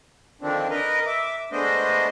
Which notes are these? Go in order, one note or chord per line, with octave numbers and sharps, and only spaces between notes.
D3 D#3 F3 C4 D4
A#4 B4 D#5
E5 D6
G#3 A3 B3 D4 C5 D#5